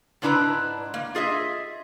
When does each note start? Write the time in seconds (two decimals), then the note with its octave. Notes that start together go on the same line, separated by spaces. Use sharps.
0.22 G#2 G#3 D4 E4 B4 A#5
0.94 A#3
1.15 F4 G#4 D#5 E5